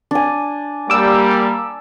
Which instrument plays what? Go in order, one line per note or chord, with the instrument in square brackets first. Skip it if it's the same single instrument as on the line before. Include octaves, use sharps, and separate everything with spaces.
[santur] D4 G#5
[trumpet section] G3 [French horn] A#3 [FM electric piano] D6 E6